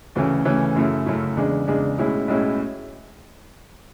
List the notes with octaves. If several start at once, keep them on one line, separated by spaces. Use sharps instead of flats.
D2 C#3 E3 A3 C#4
D2 C#3 E3 A3 C#4
F#2 C#3 F#3 A3 E4
F#2 C#3 F#3 A3 E4
E2 C#3 G#3 D4
E2 C#3 G#3 D4
B1 A2 G#3 C#4 E4
B1 A2 G#3 C#4 E4